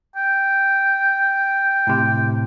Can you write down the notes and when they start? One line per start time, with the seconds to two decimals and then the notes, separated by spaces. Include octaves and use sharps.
0.16 G5
1.87 A2 C3